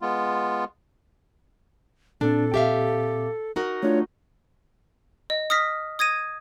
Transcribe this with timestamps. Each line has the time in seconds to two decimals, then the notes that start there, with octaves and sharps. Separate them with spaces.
0.01 G#3 B3 F4
2.21 A#2 C4 D4 A4
2.54 G4 E5 F5
3.56 D#4 F#4 A#4
3.83 A3 D4 F4 C#5
5.30 D#5
5.50 D#6 F6 A#6 B6
5.99 D#6 G#6 A#6 D#7